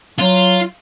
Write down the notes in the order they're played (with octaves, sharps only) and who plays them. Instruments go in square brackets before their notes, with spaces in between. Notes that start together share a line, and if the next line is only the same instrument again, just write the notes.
[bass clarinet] F#3 [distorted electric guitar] F4